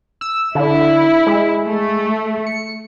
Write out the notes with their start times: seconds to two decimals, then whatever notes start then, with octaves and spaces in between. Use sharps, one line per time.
0.21 E6
0.55 D3 E4
1.26 G#3
1.66 A3
2.47 C#7